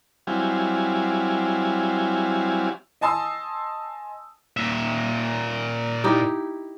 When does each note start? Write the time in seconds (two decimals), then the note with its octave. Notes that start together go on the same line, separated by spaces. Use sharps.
0.27 F#3 G3 C4 E4 F5 G#5
3.01 D#5 G#5 A5 C6 D#6 E6
4.57 A#2 E5
6.04 D#4 E4 G4